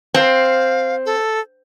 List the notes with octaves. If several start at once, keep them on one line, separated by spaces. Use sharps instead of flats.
C4 F5
A4